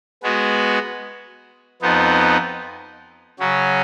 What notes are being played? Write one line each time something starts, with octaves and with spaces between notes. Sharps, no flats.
G#3 B3 F#4
F2 F3 B3 D#4
C#3 F#3 C#4